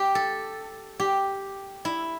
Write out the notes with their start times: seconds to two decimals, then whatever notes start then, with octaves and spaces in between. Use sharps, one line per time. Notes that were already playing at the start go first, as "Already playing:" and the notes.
Already playing: G4
0.15 A4
1.00 G4
1.85 E4